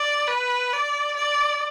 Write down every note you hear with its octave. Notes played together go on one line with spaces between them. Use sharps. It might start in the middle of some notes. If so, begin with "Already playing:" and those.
Already playing: D5
B4
D5
D5